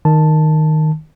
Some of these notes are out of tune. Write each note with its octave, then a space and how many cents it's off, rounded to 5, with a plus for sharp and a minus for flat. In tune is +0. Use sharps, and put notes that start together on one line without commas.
D#3 +0 A5 +0